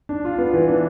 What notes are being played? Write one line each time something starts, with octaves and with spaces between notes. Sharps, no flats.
D4
F4
B3
E3
D4